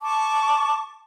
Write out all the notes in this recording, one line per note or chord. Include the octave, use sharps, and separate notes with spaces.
A5 C#6 D6